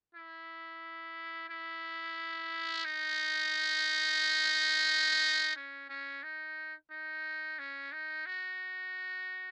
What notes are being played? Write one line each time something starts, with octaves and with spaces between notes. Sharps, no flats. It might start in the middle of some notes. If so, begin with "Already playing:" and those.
E4
E4
D#4
C#4
C#4
D#4
D#4
C#4
D#4
F#4